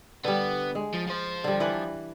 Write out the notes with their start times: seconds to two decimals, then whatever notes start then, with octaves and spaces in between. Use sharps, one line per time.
0.24 D3 G3 B3
0.75 G#3
0.94 F3
1.07 F3 C5
1.44 D3 G3
1.60 E3 D4 B4